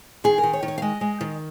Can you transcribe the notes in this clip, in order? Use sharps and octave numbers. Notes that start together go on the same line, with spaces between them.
D#3 G#4
A#4
D#3
C#5
D#3
C#5
F5
G#3 D#5
G#3
D#3